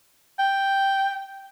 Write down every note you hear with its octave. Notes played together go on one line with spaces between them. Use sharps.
G5